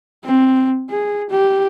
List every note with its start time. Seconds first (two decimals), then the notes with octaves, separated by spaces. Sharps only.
0.24 C4
0.90 G#4
1.30 G4